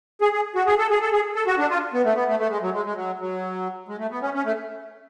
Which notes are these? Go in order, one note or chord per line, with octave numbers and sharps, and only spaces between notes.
G#4
G#4
F#4
G#4
A4
G#4
A4
G#4
A4
F#4
D4
F4
B3
A3
B3
A3
A3
G#3
F#3
G#3
G#3
F#3
F#3
G#3
A3
B3
C#4
C#4
A3